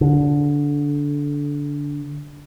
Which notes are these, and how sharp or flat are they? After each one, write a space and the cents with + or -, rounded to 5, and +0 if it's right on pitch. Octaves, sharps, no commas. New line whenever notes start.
D3 -15